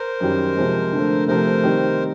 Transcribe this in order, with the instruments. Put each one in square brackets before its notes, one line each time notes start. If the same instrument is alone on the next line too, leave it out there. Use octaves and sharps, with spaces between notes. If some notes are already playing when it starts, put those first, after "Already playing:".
Already playing: [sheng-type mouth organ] A#4 C5
[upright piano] F#2 D#3 G3
C3 F3 G#3
D3 F3 A3
[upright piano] C3 F3 A3 [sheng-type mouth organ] A#4 C5
[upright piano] D#3 G3 C4